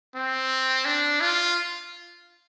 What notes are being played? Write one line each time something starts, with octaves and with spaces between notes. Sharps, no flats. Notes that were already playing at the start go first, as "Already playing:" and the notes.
C4
D4
F4